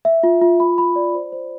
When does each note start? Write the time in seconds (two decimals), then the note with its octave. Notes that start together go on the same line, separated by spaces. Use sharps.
0.05 E5
0.23 F4
0.42 F4
0.60 B5
0.78 B5
0.96 D5
1.15 C5
1.32 C5